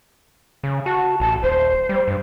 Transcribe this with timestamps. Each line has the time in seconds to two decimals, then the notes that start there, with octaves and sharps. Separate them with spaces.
0.63 C#3
0.86 F#4 A5
1.20 A1 A5
1.43 D#1 C5
1.89 G3
2.08 G2